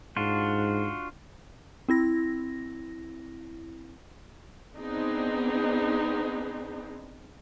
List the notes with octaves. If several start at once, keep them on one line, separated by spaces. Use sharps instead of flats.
G#2 D4 F4 F#4
C4 E4 A#6
B3 C4 D4 D#4 G#4